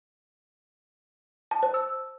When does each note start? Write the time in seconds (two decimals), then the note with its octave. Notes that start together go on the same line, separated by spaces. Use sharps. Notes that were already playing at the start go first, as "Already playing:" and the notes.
1.51 A5
1.63 C5
1.74 E6